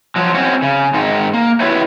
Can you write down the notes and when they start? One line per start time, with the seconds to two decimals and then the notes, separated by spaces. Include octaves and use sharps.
0.16 F3 F#3
0.34 C4 C#4 F#4
0.62 C#3
0.94 G#2 D#3 G#3
1.33 A#3
1.60 E4 F#4 G4 B4 C#5 E5